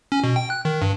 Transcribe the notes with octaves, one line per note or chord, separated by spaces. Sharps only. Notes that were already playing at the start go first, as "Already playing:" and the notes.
C#4
B2
G5
F#6
D#3
G2